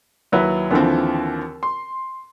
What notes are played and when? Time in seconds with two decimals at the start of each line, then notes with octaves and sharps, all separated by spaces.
0.32 D#2 F#3 E4 B4
0.71 D#2 D3 E3 F3 C4
1.63 C6